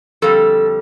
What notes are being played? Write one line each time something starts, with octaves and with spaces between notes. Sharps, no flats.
F2 D3 G3 A4